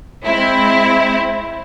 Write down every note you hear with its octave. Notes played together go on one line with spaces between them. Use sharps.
G#3 C4 E4